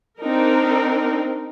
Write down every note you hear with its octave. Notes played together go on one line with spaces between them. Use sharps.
C4 D4 D#4 A#4